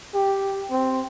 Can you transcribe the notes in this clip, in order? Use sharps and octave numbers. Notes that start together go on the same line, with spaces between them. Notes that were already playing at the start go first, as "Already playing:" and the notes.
G4
C4